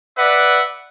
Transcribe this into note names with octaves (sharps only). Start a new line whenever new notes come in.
B4 D5 E5 F#5